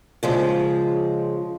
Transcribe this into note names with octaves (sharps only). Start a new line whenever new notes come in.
C#3 F3 G#3